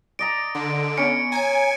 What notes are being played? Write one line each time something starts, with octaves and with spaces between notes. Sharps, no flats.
D5 D#5 A#5 D7
D3 C6
B3 C#4 C#7 D7
C#5 G#5 A#5